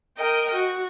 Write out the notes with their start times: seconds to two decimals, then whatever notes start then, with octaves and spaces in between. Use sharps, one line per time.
0.17 A#4 D#5 G5
0.54 F#4